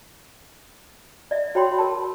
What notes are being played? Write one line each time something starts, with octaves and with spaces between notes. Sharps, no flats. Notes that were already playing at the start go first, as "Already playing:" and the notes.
D5 E5
F#4 C#5 G5 B5 C6
A#4 A5